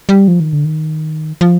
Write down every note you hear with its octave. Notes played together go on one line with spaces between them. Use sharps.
G3
F3
D#3
D3
D#3
F3